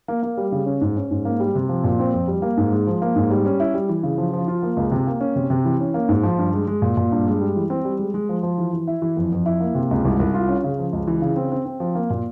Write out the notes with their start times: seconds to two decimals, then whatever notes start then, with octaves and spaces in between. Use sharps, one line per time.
0.08 A#3
0.23 A#3
0.37 G3
0.52 C#3
0.66 C#4
0.81 G#2
0.97 C#4
1.11 G#2
1.25 A#3
1.40 G3
1.55 C3
1.69 F3
1.84 A#2
1.99 C4
2.13 F2
2.28 G3
2.42 A#3
2.57 G#2
2.73 G#3
2.87 F3
3.02 A#3
3.16 G#2
3.31 G3
3.46 C#4
3.60 E4
3.74 G3
3.89 E3
4.03 C#3
4.18 F3
4.33 F3
4.48 F4
4.63 A#3
4.77 C#2
4.92 C3
5.07 A#3
5.21 C#4
5.36 C3
5.50 C3
5.65 E3
5.80 C#4
5.94 A#3
6.09 G#2
6.23 F3
6.39 G2
6.53 G#3
6.67 G#3
6.82 A#2
6.97 A#2
7.12 G2
7.27 G#3
7.41 G3
7.56 E3
7.70 C4
7.85 G3
7.99 G#3
8.14 G#3
8.29 F3
8.43 F3
8.58 E3
8.73 E3
8.87 E4
9.02 E3
9.17 F2
9.32 F2
9.46 E4
9.60 A#3
9.75 C3
9.91 C#2
10.05 C2
10.20 C2
10.34 F4
10.49 C#4
10.64 C#3
10.79 F3
10.93 C#2
11.07 E3
11.22 C#3
11.36 C4
11.52 C4
11.65 C4
11.80 F3
11.95 A#3
12.10 A#2